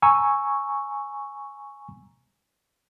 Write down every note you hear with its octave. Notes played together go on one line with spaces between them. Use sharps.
G#5 A#5 C#6 E6